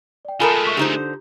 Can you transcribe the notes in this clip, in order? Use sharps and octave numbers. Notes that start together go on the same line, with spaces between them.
D5 G5
G#3 A3 F4 A4 A#4 G#5 B5 D#6
E5 C#6 B6
D3 D#4 F4 G4 C5